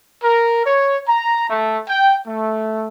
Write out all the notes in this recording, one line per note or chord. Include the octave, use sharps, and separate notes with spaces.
A#4
C#5
A#5
A3
G5
A3